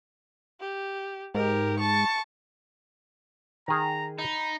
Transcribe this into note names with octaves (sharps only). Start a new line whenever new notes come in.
G4
G#2 G4 A#4
A5 C#6
D#3 G#4 A#5
D#4 B5